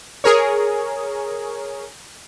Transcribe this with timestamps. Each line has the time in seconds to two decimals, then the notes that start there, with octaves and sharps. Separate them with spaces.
0.24 G#4 A#4 C#5